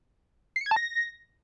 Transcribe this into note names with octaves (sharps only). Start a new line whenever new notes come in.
C7
C#7
G#6
A5
A#6